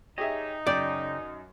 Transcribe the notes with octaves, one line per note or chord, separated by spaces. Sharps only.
D#4 G4 G#4 C#5 D#5 E5
F#2 C#3 D5 G5